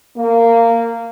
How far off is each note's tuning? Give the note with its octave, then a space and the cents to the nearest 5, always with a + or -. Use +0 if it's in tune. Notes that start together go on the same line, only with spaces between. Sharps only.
A#3 -15